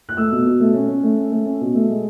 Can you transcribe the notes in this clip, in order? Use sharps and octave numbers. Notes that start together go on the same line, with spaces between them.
F#6
A3 E6
B2
B2
A3
C#4
C#4
A3
C#4
A3
C#4
B2
A3
G#3